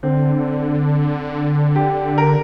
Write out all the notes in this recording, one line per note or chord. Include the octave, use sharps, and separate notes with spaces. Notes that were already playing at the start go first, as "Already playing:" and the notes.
D3 C4
G4
A#4